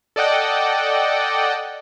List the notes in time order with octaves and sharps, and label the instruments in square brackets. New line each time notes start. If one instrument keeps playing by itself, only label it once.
[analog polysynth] A4 D5 D#5 F#5 G5